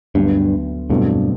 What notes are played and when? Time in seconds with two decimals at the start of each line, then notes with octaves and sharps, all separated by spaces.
0.15 D2 G2 D3 F#3 B3
0.89 E2 G2 B2 F#3 A3 C4